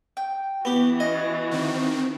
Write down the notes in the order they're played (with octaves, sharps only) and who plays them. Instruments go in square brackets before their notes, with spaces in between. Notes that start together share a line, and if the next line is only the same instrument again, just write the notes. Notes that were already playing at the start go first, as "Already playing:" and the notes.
[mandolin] G5
[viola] E3 F#4 [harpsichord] B3 G4
[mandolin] C#4 [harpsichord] D#5
[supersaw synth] D#3 C4 [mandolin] D4